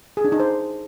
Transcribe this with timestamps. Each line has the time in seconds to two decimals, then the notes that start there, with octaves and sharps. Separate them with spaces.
0.17 G#4
0.25 D4
0.32 D#4
0.40 C5